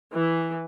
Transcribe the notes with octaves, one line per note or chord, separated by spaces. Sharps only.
E3